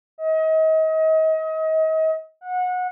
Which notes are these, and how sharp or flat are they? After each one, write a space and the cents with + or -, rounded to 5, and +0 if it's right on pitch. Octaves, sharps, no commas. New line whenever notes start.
D#5 +35
F#5 -25